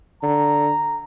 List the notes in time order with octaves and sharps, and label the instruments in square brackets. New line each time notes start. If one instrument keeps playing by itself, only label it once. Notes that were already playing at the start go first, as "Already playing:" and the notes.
[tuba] D3 [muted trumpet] A#5